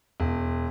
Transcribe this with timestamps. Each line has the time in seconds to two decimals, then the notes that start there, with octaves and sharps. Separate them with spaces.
0.20 E1